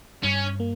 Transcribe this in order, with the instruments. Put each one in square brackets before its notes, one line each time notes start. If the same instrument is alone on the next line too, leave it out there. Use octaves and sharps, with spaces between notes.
[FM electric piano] G2 [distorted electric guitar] C#4
[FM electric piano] A#3